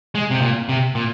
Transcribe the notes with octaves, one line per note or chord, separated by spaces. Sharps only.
G#3
C3
A#2
C3
A#2